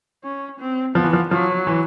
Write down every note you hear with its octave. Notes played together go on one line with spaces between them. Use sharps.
C#4
C4
F3 B3
E3
F3
F3 F#3
E3